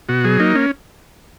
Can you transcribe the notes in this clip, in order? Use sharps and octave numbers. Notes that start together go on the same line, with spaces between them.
B2 F#4
F#3 G#4
A#3 D#4
C#4